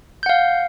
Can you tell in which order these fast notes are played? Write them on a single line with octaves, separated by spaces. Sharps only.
G6 F#5 F5